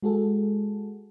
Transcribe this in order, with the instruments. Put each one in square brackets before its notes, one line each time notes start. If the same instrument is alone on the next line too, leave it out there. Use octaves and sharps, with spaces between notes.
[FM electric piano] G#3 F#4 G#4 A4